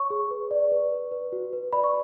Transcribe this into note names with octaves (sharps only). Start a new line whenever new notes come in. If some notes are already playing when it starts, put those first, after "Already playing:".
Already playing: C#5 C#6
G#4
B4
D5
B4
B4
B4
F#4
B4
D5 B5
C#6